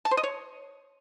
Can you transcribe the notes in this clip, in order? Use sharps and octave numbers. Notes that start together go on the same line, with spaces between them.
A5
C5
D#5
C#5